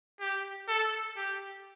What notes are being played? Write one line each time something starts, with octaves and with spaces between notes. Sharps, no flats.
G4
A4
G4